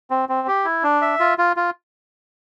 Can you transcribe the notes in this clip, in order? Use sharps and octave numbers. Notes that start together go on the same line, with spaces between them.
C4
C4
G4
E4
D4
E5
F4
F4
F4